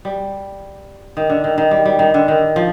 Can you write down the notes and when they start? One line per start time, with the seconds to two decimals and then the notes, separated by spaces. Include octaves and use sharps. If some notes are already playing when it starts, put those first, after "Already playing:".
0.05 G3
1.17 D#3
1.30 D3
1.44 D#3
1.58 D#3
1.71 G3
1.85 G3
1.99 D#3
2.14 D3
2.28 D#3
2.56 F3